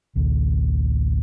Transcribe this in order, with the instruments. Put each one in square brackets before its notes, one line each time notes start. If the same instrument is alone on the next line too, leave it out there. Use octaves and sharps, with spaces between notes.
[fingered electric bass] A1 D2